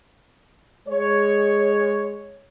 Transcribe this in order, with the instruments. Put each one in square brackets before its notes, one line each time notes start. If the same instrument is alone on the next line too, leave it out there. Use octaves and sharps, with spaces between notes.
[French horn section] G#3 C#5